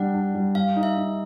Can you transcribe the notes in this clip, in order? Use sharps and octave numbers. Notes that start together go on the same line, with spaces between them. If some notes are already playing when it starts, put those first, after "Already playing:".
Already playing: G3 D4 F#5
D4
G3
G3 F5
D#4
E5
D#4